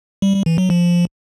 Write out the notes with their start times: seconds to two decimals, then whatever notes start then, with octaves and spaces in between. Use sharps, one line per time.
0.22 G3
0.34 G3
0.46 E3
0.58 F#3
0.70 F3